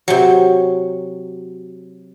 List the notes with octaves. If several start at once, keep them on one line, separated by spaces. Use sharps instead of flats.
C3 F#3